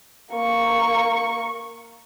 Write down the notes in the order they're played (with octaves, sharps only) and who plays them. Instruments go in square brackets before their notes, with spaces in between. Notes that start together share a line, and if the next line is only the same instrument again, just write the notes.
[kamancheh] A#3 C#6